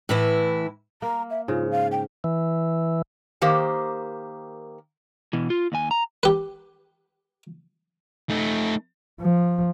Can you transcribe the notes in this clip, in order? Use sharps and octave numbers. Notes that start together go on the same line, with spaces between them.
A2 E3 E4
A#3 A#5
E5
G#2 C#3 F4
F5
G5
E3
D#3 A#3 G4 C5
B2 E3
F4
D#2 G#5
A#5
G4 B4
A3 D#4
F3